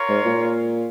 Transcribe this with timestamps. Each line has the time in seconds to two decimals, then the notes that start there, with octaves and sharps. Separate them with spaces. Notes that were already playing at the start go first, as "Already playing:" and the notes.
Already playing: F4 A#4 C#5
0.09 G#2
0.25 A#2